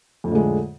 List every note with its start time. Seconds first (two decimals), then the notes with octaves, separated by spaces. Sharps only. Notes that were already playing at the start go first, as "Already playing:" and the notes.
0.24 F2
0.28 A2
0.31 D3
0.35 G#3